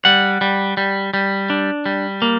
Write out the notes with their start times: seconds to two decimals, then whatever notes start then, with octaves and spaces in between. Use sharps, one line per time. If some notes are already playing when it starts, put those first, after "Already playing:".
0.05 G3 F#5
0.41 G3
0.77 G3
1.14 G3
1.50 D4
1.86 G3
2.22 A#3